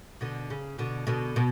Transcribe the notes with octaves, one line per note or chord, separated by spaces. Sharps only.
B2 D3
C#3
B2 D3
B2 D3
B2